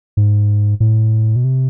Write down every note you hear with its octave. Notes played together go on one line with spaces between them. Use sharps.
G#2
A2
B2
C3